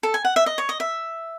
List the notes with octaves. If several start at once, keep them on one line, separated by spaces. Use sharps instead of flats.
A4
G#5
F#5
E5
D#5
C#5
D#5
E5